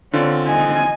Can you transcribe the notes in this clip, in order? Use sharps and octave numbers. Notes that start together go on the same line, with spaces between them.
D3 C4 C#4 F4
D#5 G#5